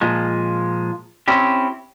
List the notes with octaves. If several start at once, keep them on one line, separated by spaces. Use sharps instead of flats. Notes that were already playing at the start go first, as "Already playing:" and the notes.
A#2 F3 G#3
C4 C#4 E4 G4